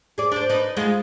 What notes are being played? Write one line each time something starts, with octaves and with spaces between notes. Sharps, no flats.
G#4 D5
D4 C5
D#4 B4
G#3 D#4 F4